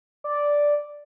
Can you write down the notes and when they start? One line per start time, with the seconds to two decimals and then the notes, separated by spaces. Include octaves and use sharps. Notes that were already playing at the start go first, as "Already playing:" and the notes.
0.24 D5